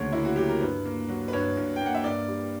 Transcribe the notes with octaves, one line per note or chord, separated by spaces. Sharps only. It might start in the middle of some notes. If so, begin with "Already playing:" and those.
Already playing: D2 C#3 F#3 A#3 C#5
A#3 E4
F#4
F#3 G4
A#4
G2 B4
A#3
F#3
B4
G2 C#5
G2
G5
A#3 F#5
E5
G2 D5
G3